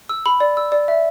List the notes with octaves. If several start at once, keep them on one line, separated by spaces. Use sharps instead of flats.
E6
B5
D5
E6
D5
E5